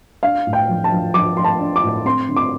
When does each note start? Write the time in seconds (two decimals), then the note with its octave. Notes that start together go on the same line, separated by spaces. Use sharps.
0.23 D4 F5
0.47 A2
0.53 G5
0.69 F3
0.84 A5
0.92 F3
1.14 F3 D6
1.37 F3 C6
1.44 A5
1.60 D4
1.76 D6
1.83 A2
2.05 C4 C6
2.29 D3
2.37 D6